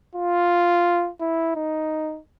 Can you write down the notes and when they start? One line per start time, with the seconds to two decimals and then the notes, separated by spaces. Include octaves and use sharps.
0.15 F4
1.20 E4
1.56 D#4